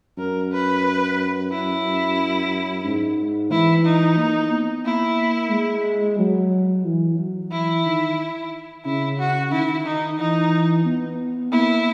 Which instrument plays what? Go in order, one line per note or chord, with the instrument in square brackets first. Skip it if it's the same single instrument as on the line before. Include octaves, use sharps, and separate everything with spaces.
[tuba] F#2 [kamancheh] A#4
[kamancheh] B4
E4
[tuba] G#2
[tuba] E3 [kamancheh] E4
[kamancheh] D#4
[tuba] A#3
B3
[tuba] A#3 [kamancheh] E4
[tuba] G#3
F#3
E3
F#3
[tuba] E3 [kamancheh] E4
[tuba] D#3
[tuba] C#3 [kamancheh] E4
[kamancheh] F#4
[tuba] D#3 [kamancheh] E4
[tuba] D#3 [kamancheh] D#4
[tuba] E3 [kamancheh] D#4
[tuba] B3
[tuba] A#3 [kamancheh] E4